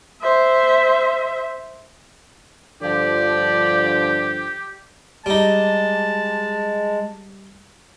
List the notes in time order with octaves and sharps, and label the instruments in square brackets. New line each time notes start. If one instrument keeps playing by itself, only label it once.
[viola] C5 E5
[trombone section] G2 D3 F3 [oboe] G4 [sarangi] D5
[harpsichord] G3 D#4 [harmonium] G#3 [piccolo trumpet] A5